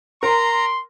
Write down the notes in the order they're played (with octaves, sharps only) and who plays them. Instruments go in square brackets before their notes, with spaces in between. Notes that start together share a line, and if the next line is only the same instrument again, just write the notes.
[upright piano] A#4 [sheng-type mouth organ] A#5 [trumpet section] C6